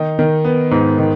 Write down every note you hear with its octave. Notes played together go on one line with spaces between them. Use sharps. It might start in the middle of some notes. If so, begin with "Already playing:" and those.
Already playing: D#3 D#4
D#3
B3
G#2
D#3